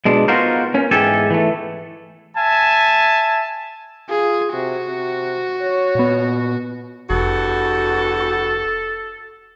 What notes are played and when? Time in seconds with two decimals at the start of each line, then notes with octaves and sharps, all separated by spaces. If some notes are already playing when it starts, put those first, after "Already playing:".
0.05 B2 G#3 D4
0.28 B3 D#4 F4 F#4 A#4 C5
0.74 A#3 C#4
0.91 E2 G#2 G4 A4 G#5
1.30 E3 A3
2.36 E5 G#5 A5
4.09 F4 G#4
4.53 C3 F#4
4.88 C3
5.61 C#5
5.95 A#2 B3
7.10 F1 E2 G2 F#4 A4